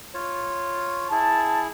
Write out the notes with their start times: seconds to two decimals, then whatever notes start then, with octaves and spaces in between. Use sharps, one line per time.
0.14 F4 C#5
1.11 E4 G#4 A5